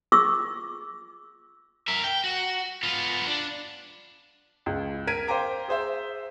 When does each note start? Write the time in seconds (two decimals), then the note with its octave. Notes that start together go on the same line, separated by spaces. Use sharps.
0.12 F4 G#4 C#6 D6 E6
1.88 A#4 E5
2.04 G5
2.24 F#4
2.83 B3 F4
3.27 D4
4.66 C#2
5.07 A#4 G#6 B6 D7 D#7
5.28 C5 F5 G5 A#5 D6
5.68 G#4 C5 E5